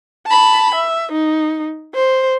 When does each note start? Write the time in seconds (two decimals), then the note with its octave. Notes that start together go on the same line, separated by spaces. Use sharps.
0.27 A5 B5
0.75 E5
1.12 D#4
1.95 C5